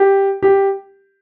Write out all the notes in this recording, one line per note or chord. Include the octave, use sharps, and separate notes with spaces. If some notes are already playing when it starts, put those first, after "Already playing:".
Already playing: G4
G4